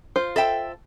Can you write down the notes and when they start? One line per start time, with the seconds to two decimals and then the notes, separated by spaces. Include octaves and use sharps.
0.16 F4 C5
0.36 A4 E5 G5